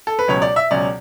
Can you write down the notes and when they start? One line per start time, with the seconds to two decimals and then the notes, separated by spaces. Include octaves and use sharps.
0.07 A4
0.19 B4
0.27 C#2 B2 F#3 C#4 C#5
0.42 D5
0.56 E5
0.71 C#2 B2 F#3 C#4 D5